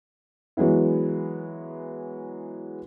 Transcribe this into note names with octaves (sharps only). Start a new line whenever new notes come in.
E3 F#3 G#3 B3 E4